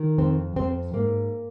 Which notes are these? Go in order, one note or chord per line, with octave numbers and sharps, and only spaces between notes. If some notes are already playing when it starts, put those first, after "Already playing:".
Already playing: D#3
F2 C4
F2 C4
G#2 A#3